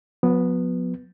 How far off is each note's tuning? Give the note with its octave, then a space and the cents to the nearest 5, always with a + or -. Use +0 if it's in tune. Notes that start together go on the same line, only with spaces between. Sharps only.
F#3 -45 B3 +0